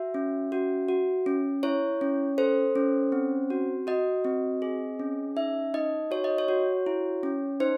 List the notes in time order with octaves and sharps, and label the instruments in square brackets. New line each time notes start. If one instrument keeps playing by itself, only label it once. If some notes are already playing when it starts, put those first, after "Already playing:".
Already playing: [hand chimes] F#4 E5
C#4
F#4
F#4
C#4
E4 C#5
C#4
A4 C5
C#4
C4
F#4
F#4 D#5
C4
G#4
C#4
D#4 E5
D#4 D#5
F#4 C#5
D#5
C#5
F#4
E4
C#4
D#4 C5